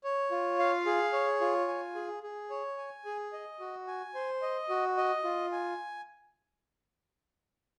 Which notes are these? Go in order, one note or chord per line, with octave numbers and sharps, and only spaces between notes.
C#5
F4
F5
G#4
C#5
F4
G#5
G#4
G#4
C#5
G#5
G#4
D#5
F#4
G#5
C5
D#5
F#4
D#5
F4
G#5